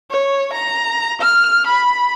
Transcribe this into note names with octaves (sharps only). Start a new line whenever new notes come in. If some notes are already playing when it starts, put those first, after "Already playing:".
C#5
A#5
F6
B5